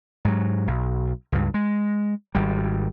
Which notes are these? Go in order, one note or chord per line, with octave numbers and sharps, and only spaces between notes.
G#2 F#3
B1
C#2 G2
G#3
G#1 G3